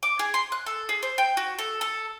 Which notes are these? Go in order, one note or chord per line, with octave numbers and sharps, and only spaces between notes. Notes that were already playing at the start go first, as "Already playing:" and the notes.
D6
G#4
C6
F#6
A4
G#4
C5
G5
F#4
A4
A4